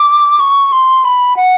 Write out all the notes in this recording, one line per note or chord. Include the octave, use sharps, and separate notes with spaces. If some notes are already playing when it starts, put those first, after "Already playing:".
Already playing: D6
C#6
C6
B5
F#5